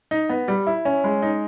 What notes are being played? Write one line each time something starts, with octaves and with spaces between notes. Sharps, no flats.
D#4
B3
G3
E4
C#4
G#3
D#4